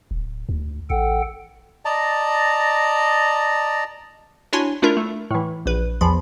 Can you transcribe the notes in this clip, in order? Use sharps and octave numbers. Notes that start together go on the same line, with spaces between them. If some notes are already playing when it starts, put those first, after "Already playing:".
D1
D2
A1 A4 F#5 G5
D5 D#5 A5 A#5
D4 E4 F#4 C#5 G#5 C6
A3 D4 E4 F4 A#4
A3
A2 E3
A#1 B4
E2 F3 B5